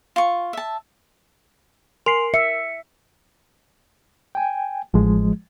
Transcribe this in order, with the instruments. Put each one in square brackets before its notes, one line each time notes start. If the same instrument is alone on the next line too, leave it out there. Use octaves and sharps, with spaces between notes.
[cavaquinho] F4 C#6
E5 A5
[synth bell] A#4 C7 [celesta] G#5 C6 F7
[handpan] E5 [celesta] C#7
[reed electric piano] G5 G#5
[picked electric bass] A1 [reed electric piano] F3 G#3